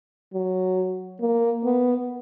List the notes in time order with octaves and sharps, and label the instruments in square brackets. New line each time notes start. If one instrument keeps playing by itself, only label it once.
[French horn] F#3
A#3
B3